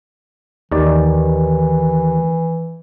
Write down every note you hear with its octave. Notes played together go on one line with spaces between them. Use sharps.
D#2 D#3 E3 D5